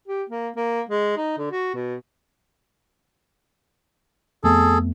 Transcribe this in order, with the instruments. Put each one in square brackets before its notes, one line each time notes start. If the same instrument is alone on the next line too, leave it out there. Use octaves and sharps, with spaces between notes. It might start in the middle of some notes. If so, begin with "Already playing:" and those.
[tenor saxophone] G4
A#3
A#3
G#3
D#4
D3
F#4
B2
[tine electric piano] F2 A3 B3 [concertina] G#4 A4